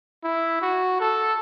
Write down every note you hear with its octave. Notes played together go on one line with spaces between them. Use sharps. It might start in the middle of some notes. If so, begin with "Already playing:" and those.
E4
F#4
A4